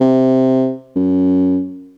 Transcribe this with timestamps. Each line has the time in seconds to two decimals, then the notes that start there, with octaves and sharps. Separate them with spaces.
0.01 C3
0.96 F#2